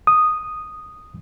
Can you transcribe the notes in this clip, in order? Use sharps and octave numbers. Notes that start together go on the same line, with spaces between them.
D#6